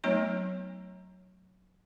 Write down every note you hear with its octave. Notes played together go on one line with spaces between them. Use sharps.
F#3 A3 B3 D#4 C#5 A#5